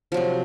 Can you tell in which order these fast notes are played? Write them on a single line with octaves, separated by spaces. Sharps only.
F3 F#3 C3